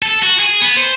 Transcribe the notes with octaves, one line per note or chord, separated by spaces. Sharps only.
A4
F#4
G#4
B3
C5